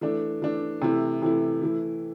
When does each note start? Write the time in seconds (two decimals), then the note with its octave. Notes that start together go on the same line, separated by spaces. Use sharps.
0.01 E3 A3 D4
0.42 E3 A3 D4
0.82 C3 E3 A3 E4
1.22 C3 E3 A3 E4
1.62 E3 A3 E4